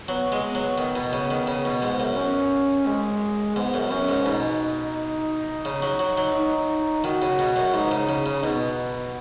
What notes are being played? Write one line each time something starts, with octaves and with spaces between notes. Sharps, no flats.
F#3 B3
G#3
B3
F#3
D#3
B2
C#3
D#3
C#3
B2
G#2
F#2
C#4
G#3
G#2 B3
F#2
F#2 C#4
G#2
B2 D#4
C#3
F#3
F#3
F#3
D#4
D#3 F#4
C#3
B2
F#2
G#2 D#4
C#3
C#3
C#3
B2 B3